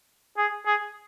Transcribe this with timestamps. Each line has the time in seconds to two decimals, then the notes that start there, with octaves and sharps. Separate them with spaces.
0.38 G#4
0.66 G#4